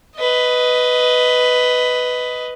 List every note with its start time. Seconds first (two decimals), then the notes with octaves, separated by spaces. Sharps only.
0.16 B4 D#5